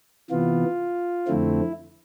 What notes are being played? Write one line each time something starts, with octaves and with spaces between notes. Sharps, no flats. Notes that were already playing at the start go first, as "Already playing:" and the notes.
C3 E3 B3 F4
F2 D3 A3 C4 E4